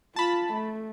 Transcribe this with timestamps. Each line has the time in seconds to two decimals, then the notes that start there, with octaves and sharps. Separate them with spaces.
0.16 F4 A5 B5
0.53 A3